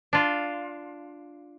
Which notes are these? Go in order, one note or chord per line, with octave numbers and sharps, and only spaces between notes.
D4 F4